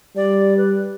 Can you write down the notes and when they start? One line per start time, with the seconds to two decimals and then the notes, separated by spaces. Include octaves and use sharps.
0.16 G3 D5
0.57 B4